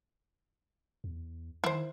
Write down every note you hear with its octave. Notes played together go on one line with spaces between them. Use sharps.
E2
D#3 E4 C5